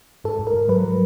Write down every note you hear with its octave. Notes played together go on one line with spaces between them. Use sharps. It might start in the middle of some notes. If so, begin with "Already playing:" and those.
G#2 A4
G#2
A#4
G#2
F#3 B4
F#3